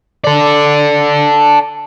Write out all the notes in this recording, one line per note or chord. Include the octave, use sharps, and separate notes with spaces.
A4 D5